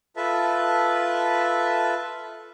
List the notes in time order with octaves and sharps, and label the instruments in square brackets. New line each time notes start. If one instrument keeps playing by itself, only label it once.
[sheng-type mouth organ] F4 A4 B4 E5 A5